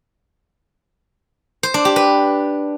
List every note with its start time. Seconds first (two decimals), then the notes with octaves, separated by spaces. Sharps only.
1.63 C5
1.74 D4
1.85 G4
1.96 B4